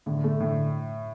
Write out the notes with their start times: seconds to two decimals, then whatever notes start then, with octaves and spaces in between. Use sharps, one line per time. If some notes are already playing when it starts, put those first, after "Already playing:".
0.06 A2 D3
0.24 A3
0.40 A2 D3